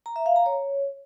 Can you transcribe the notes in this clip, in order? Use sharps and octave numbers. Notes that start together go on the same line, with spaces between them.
A#5
E5
F5
A#5
C#5